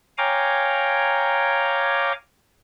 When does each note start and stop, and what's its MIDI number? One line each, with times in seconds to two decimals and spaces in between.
0.18 2.12 73
0.18 2.12 77
0.18 2.12 79
0.18 2.12 80
0.18 2.12 82
0.18 2.12 86